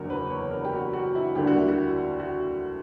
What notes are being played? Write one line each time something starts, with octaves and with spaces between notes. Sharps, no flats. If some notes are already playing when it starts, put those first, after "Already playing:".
Already playing: F#1 E2 D3 A#3 F#4 A#4
B4
C#5
A#4
G4
F#4
F#4
E4
D2 D3 G3 A#3 G4
F#4
E4
F#4
F#4